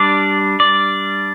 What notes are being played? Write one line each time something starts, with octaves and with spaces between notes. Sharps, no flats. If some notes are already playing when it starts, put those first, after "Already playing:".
Already playing: G3 D4 D5
D5